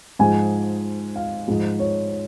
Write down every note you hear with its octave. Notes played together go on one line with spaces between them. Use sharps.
G#2 F3 G#3 G#5
F5
G#2 F3 G#3
C#5